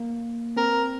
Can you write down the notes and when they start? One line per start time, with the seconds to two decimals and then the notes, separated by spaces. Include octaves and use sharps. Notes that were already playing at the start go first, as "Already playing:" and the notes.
Already playing: A#3
0.57 C4 A#4